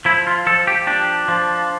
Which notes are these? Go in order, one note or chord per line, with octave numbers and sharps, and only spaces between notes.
F3 E4
F4
F3 A4
G4
D4 G4
F3